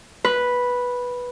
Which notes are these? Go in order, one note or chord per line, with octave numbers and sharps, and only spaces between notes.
B4